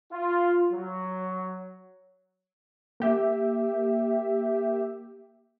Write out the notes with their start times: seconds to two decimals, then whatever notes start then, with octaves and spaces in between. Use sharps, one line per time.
0.12 F4
0.71 F#3
3.00 A#3 G4 E5